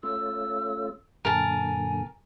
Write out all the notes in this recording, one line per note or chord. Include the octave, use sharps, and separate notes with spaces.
A3 C#4 F4 E6
F#2 A#2 D3 A#4 G#5 A5